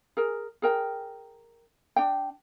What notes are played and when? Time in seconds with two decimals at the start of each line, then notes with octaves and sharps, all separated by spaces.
0.17 G#4 A#4
0.62 G#4 A#4 G5
1.96 D4 G5